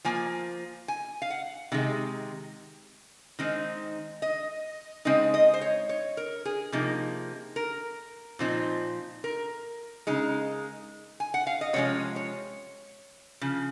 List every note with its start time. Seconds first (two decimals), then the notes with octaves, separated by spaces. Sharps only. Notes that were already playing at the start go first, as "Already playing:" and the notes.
0.05 F3 A#3 G#5
0.88 G#5
1.22 F5
1.30 F#5
1.72 C3 D#3 G#3
3.39 D#3 G#3 C4 D#4
4.22 D#5
5.05 C#3 G#3 C4 D#4 D#5
5.34 D#5
5.54 C5
5.61 C#5
5.89 C#5
6.17 A#4
6.45 G#4
6.72 C3 F3 A#3 D#4
7.56 A#4
8.39 A#2 F3 C4 D#4
9.24 A#4
10.07 C#3 G#3 D#4
11.20 G#5
11.34 F#5
11.47 F5
11.61 D#5
11.73 C3 F3 G#3 C#4 C#5
12.16 C#5
13.41 C#3 F3